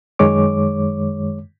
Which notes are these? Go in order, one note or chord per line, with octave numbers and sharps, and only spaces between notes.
F#2 D#3 G#3 C#5 D6